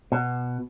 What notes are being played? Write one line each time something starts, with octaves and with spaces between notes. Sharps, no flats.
B2